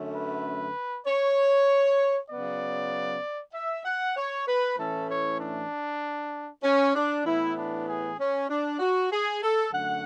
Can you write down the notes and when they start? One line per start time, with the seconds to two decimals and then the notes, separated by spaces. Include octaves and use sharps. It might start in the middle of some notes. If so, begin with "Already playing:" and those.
Already playing: F#2 D3 A3 C#4
0.14 B4
1.06 C#5
2.30 C#3 F#3 B3 D5
3.53 E5
3.85 F#5
4.16 C#5
4.46 B4
4.78 A2 E3 A3 C#4 A4
5.08 C#5
5.39 D4
6.63 C#4
6.94 D4
7.25 A2 E3 B3 E4
7.56 D4
7.87 G#4
8.18 C#4
8.48 D4
8.79 F#4
9.11 G#4
9.42 A4
9.72 F#2 D3 A3 F#5